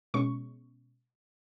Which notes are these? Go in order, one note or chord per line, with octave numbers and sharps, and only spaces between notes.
B2 G#3 C#4 C#6